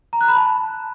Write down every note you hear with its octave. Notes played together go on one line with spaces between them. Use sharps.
A#5
F#6
B5
A5